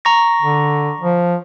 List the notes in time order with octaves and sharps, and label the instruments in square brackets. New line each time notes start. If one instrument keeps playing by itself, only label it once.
[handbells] A#5 C#6 A#6
[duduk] D3
F3